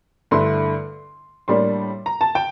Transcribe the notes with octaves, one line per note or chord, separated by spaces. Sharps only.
G2 D3 A3 E4 C6
A2 G3 A#3 D4 C6
A#5
A5
G5